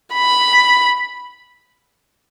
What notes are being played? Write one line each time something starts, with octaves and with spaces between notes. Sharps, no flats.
B5